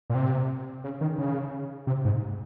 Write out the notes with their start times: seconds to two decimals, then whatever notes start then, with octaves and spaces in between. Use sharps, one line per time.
0.10 A#2
0.15 C3
0.84 C#3
1.01 D#3
1.18 C#3
1.87 C3
2.05 G#2